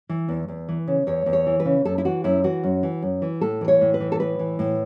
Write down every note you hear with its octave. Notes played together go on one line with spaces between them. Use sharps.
E3
E2
E2
E3
C#3
E2 C#5
E2
C#5
E3
B4
C#3
F#2 A4
E4
E3 F#4
F#2 E4
E3 F#4
F#2
E3
F#2
E3
A2 A4
E3
C#5
A2
B4
E3
A4
A2 B4
E3
A2